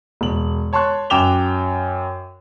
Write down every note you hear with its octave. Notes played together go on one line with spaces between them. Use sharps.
E1 F#7
C#5 A5 C6 C#6 F#6
F#2 G5 D6 E7 F7 G7